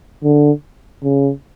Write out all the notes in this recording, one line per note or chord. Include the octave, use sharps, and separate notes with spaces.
D3
C#3